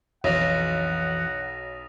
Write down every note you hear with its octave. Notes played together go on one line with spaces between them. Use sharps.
B1 F2 E3 F#5 D#6 A#6 F7